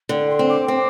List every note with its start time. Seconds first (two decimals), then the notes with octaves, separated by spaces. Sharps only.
0.09 D3 G5
0.29 C6
0.39 C4
0.48 D6
0.68 C4